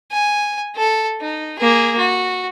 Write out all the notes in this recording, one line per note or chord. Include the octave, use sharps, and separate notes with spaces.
G#5
A4
D#4
A#3 G#4
F#4